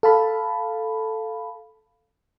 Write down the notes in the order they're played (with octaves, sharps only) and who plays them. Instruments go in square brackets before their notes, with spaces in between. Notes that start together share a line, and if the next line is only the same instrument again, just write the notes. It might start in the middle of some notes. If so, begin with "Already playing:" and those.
[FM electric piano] A4 F5 A5 B5